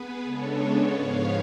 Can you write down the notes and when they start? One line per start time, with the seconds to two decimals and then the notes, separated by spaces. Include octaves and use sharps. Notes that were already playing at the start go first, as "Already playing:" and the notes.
Already playing: B3 G#4 B4
0.23 C#3 G#3 B3 D4 A4 C#5
0.94 G#2 F3 B3 C#5 F5